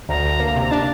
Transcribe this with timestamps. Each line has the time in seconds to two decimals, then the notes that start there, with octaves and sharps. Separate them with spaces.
0.09 D2 A#5
0.25 D2
0.40 A#3
0.56 C3
0.62 A#5
0.71 D4 A5